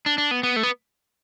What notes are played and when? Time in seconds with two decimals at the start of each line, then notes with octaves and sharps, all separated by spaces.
0.06 D4
0.18 D4
0.31 B3
0.43 B3
0.56 A3
0.63 B3